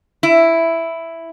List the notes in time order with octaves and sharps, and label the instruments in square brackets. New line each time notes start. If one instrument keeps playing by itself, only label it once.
[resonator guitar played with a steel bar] E4